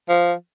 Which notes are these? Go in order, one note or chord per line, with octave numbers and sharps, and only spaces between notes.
F3